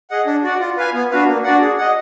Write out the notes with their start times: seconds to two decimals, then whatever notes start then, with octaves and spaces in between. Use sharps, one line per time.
0.10 G#4 D#5 F#5
0.26 D4
0.44 F#4 D5 F#5
0.60 F4
0.77 B4 F5 G#5
0.94 B3
1.11 D4 F#4 B4 F5
1.28 A#3
1.44 D4 F#4 D5 F#5
1.61 G#4
1.78 D#5 F#5